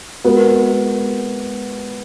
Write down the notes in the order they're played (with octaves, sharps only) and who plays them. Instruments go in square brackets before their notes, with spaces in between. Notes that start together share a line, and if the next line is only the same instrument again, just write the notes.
[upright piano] G#3 B3 F#4 A#4